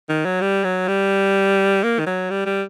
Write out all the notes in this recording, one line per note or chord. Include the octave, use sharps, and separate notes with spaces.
D#3
F#3
G3
F#3
G3
A#3
D#3
F#3
G3
G3